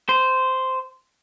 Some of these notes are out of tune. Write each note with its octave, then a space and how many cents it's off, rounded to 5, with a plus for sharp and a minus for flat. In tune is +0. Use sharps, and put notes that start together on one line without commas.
C5 -10